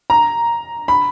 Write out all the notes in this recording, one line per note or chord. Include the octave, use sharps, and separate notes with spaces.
A#5
B5